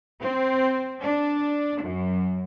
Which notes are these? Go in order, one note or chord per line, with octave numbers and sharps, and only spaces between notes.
C4
D4
F#2